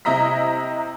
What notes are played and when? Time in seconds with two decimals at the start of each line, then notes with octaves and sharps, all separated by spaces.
0.05 C3 E4 D#5 A#5 B6